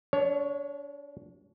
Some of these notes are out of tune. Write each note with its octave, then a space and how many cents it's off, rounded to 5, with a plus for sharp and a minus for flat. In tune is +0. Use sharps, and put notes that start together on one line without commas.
D4 -30 C#5 +10